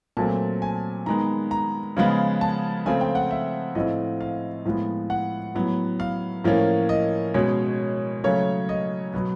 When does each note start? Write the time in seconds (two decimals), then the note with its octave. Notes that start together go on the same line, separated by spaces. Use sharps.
0.17 A#2 F#3 A3 C4 A5
0.62 G#5
1.06 D#3 G#3 B3 A#5
1.51 A#5
1.97 C#3 F3 G#3 B3
2.41 A5
2.86 C#3 F3 A3 C4 G#5
3.01 G5
3.15 F#5
3.31 E5
3.75 A2 F3 A3 C4 D#5
4.21 F5
4.65 A2 F3 G#3 B3
5.10 F#5
5.55 A2 F#3 B3
6.00 F5
6.44 A2 F3 A#3 C#4
6.89 D#5
7.34 B2 G#3 C#4 C#5
8.24 C#3 F#3 A3 C#4 C#5
8.69 D#5
9.14 B2 F#3 B3